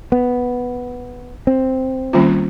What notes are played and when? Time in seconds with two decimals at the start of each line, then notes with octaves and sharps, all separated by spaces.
0.12 B3
1.47 C4
2.13 D#3 G3 A#3 C#4 F4